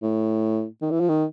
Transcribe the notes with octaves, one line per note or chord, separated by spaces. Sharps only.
A2
D#3
E3
F3
D#3